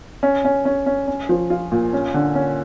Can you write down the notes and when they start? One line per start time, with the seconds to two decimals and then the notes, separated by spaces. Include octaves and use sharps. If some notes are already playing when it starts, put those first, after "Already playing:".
0.23 C#4
0.45 C#4
0.65 C#4
0.86 C#4
1.08 C#4
1.29 F3
1.50 F4
1.72 A#2
1.93 C#4
2.14 D3
2.35 C#4